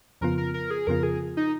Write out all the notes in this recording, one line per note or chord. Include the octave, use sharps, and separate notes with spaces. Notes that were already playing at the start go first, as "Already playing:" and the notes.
F2 C#3 F3 B3 F4 A#4
A#4
A#4
G#4
F2 C#3 F3 B3 F4 A#4
G#4
D#4